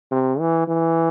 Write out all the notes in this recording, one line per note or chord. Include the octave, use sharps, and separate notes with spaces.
C3
E3
E3